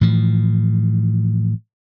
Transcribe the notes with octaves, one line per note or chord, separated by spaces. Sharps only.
A2 E3 F3